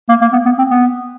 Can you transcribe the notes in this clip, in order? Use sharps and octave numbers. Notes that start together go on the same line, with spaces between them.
A#3
A#3
B3
B3
C4
B3